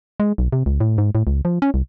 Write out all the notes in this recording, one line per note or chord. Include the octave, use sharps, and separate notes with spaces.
G#3
B1
C3
C#2
A2
G#2
A2
C#2
F3
C#4
C2